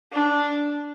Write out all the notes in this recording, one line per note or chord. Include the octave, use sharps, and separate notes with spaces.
D4